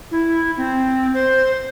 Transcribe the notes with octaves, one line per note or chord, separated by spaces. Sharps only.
E4
C4
C5